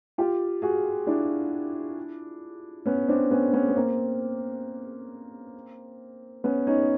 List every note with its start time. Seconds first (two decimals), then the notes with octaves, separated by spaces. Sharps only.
0.18 F4 G4
0.62 F#4 G#4
1.07 D4 E4
2.86 B3 C#4
3.08 C4 D4
3.31 B3 C#4
3.53 B3 C#4
3.68 B3
3.76 A#3 C4
6.44 B3 C#4
6.67 C#4 D#4